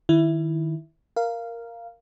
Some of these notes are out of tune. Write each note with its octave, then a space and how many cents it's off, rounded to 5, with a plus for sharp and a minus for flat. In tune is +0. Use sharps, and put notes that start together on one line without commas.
D#3 +0 E4 +0
A#4 +0 F5 -10